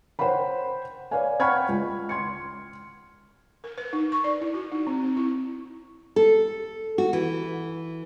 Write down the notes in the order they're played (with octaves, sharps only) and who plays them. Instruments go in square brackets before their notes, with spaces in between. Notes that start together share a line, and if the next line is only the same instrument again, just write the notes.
[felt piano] C5 C#5 F#5 G5 B5
B4 C#5 D5 F5 G#5
F#5 G5 B5 C#6 F6 G#6
C#2
C6 G#6 C#7
[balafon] A#4
B4
D#4
C#6
D5
E4
F#4
D#4
C4
C4
E4
[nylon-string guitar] A4
F#4
E3